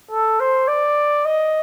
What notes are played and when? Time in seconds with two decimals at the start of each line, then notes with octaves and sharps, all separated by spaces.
0.11 A4
0.40 C5
0.68 D5
1.25 D#5